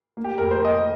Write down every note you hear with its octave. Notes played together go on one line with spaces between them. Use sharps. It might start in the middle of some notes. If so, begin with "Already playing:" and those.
A#3
G4
F2 A#4
C5
A#3 D#5